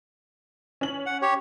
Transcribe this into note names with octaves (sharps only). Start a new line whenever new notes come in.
C#4 F#7
F#5
G4 C#5